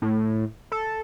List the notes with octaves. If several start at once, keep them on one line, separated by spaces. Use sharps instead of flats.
A2
A4